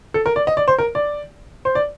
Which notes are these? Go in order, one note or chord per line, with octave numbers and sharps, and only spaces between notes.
A4
A#4
D5
D#5
D5
C5
A#4
D5
C5
D5